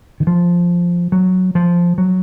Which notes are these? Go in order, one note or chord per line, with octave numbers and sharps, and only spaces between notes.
D#3
F3
F#3
F3
F#3